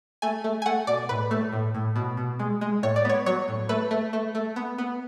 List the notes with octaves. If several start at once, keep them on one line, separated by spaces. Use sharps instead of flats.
A3 G#5
A3
G#5
A3 F#5
B2 D5
A2 B4
A3
A2
A2
B2
B2
G#3
G#3
A2 C#5
D5
B3 C#5
F#3 C#5
A2
A3 B4
A3
A3
A3
B3
B3